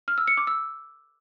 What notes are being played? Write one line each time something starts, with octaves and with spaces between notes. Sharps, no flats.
F6
E6
C#7
D6
E6